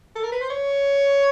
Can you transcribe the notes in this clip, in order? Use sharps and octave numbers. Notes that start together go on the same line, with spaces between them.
A4
A#4
B4
C5
C#5